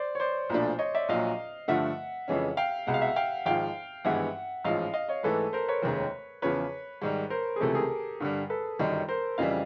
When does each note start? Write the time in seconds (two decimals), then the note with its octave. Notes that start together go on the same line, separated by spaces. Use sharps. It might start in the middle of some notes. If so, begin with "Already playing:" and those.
Already playing: C5 D5
0.15 C#5
0.20 C5 D5
0.50 B1 A#2 F3 A3 D4
0.79 C#5 D#5
0.95 D5 E5
1.09 A#1 A#2 F#3 D#5 F5
1.68 G2 D3 F3 A3 E5 F#5
2.28 F2 C#3 E3 G#3 C#4
2.57 F5 G5
2.87 C2 B2 G#3 F#5
2.94 F5
3.02 E5 F#5
3.16 F5 G5
3.46 G#1 G#2 F3 F5 G5
4.05 G#1 G2 E3 G#3 B3 E5 F#5
4.65 A1 G#2 F3 D#5 F5
4.93 D#5 F5
5.09 C#5 D#5
5.23 G#2 E3 A3 A4 B4
5.53 A#4 C5
5.68 B4 C#5
5.82 F1 D#2 D#3 G#3 C#4
6.42 E2 C#3 F3 B4 C#5
7.02 G#2 D#3 G3
7.30 A#4 C5
7.56 G#4
7.60 C#2 C3 E3 A3 G4 A4
7.75 G#4 A#4
8.20 G2 D3 G3
8.50 A4 B4
8.79 G1 F#2 D#3 G3
9.09 A#4 C5
9.38 F2 C#3 E3 G3 D#5 F5